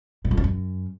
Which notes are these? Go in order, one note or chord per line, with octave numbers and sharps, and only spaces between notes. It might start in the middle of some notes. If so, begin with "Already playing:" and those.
B2
F2
C#3
F#2